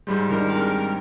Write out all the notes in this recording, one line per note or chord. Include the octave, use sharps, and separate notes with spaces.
G#2 G3 G#3 B5 C6 G6
D#3 D4 E4 A#4
C4 G#4 G5